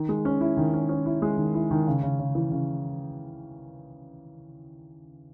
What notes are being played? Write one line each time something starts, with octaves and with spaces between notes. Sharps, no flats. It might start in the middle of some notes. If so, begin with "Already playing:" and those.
Already playing: D#3
G#3
C#4
E4
D#3
C#4
C#4
E4
G#3
D#3
E4
D#3
C#3
C#3
C#3
E3
C#3